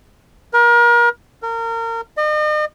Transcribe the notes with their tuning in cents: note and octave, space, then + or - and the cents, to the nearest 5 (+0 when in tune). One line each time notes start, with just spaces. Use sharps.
A#4 +35
A#4 -30
D#5 -40